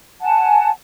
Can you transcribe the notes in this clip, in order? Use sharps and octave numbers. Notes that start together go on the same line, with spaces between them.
F#5 G#5 A5